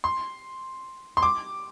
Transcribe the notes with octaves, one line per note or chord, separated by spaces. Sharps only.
C6
C6
D6